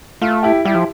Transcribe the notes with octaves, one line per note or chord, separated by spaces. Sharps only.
A3 F4
E4 G4
G3 E4 G4
F3